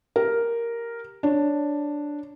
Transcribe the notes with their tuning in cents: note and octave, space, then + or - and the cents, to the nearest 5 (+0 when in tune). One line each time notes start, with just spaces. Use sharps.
G4 +0 A#4 +0
D4 +0 C#5 +5